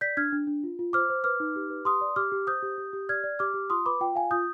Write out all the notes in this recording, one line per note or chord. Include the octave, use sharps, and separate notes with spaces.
D5 G6 B6
D4 F6 G#6
D4
D4
F4
F4
C5 D6 F6
C5
B4 D6 F6
D#4
G4
B4
G4 C6 D#6
D5
G4 D6 F6
G4
C5 D#6 G6
G4
G4
G4
D5 F6 G#6
D5
G4 D6 F6
G4
F4 C6 D#6
B4 B5 D6
F4 G5
F4 F5 G#5
F4 D#6 G6